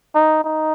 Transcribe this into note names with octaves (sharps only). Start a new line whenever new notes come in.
D#4
D#4